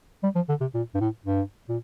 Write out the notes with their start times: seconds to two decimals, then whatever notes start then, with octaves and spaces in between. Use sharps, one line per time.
0.23 G3
0.35 F3
0.49 D3
0.61 C3
0.74 A#2
0.95 G2
1.00 A2
1.26 G2
1.68 A#2